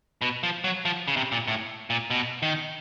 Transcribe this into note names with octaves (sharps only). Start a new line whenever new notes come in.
B2
F3
F#3
F3
C#3
C3
A#2
A2
A#2
B2
D#3